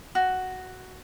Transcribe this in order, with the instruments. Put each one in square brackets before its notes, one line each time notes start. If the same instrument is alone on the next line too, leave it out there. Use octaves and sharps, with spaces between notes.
[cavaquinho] F#4